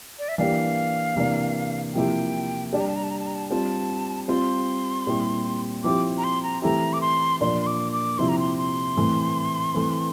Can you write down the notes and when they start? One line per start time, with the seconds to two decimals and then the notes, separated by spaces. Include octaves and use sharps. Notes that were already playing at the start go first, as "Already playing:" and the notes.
0.19 D5
0.29 E5
0.38 E3 A#3 D4 G4 F5
1.16 C3 E3 A#3 D4
1.94 C3 F3 A#3 E4 G4 G5
2.73 G3 D4 G4 A5
2.80 A#5
2.88 A5
2.96 A#5
3.04 A5
3.11 A#5
3.19 A5
3.27 A#5
3.35 A5
3.50 G3 C4 F4 A5
4.28 G3 C4 F4 C6
5.07 A#2 G3 C4 E4 G4
5.84 F3 C4 E4 G4 D6
6.18 A#5
6.24 C6
6.43 A#5
6.62 E3 A3 C4 E4 G4 A#5
6.93 D6
7.01 C6
7.40 A#2 F3 A#3 D4 C6
7.61 C6
7.67 D6
7.92 D6
8.18 C3 F3 C4 E4 G4 C6
8.29 A#5
8.39 C6
8.57 C6
8.96 A2 E3 A3 C4
9.74 E3 A3 C4